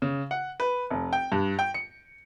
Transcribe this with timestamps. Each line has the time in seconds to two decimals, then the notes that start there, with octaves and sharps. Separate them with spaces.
0.02 C#3
0.31 F#5
0.60 B4
0.90 F1
1.13 G5
1.32 G2
1.59 G5
1.74 C#7